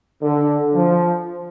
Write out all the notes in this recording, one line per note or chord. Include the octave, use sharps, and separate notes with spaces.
D3
F3